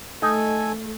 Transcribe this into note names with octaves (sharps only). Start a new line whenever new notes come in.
A3 D#4 A4 G#5